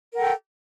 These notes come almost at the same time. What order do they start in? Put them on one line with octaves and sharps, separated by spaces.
A#4 F#5 A4 G5